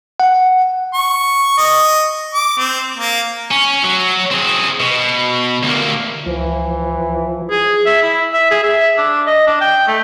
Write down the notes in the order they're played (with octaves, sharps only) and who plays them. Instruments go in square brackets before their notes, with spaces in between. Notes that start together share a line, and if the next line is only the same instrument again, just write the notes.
[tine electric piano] F#5
[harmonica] C#6
D#5
D6
C4
A#3
[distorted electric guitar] C#4
F#3
C4 G#4
B2
D2 A#3
[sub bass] C#2 [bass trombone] E3 [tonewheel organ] F3
[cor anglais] G#4
E5
E4
E5
G#4
E5
D4
D#5
D4
G5
A3